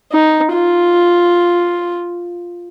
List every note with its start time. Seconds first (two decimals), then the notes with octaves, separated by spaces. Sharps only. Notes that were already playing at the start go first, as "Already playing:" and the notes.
0.12 D#4
0.53 F4